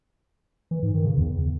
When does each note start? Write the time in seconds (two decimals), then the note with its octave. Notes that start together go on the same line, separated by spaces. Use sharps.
0.71 E3
0.83 G#2
0.94 D#3
1.06 C#3
1.18 E2